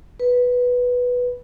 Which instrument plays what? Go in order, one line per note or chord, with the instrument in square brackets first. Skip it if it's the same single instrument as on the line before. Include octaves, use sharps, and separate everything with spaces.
[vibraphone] B4